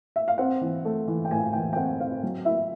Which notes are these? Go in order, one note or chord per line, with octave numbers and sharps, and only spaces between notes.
E5
F5
C4 F#5
E3
A3
E3
G5
A2 G#5
E3 G5
G5
C4 F#5
C4 F5
F#3
E4 E5